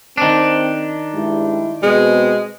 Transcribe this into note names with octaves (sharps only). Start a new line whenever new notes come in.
D#3 C4 D4
G2 G3 G#3 E4
B2 G#3 C4 G#4